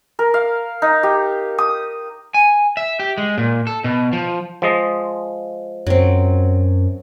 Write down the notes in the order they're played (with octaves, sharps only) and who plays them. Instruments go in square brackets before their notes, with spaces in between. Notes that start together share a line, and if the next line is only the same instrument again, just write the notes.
[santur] A#4
F5
D#4
G4
D#6
[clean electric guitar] G#5
E5
G4
G#3
A#2
A4
B2
F3
[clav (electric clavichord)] F3 G#3 D#5
[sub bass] F#2 [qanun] F#3 C4